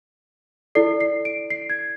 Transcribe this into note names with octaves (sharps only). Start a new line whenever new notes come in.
E4 A4 D5 C7
C7
D7
C7
G#6